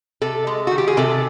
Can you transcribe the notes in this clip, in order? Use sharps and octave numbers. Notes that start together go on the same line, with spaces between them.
C3 A4
G#3
D#3 F#4
G4
G#4
C3 A4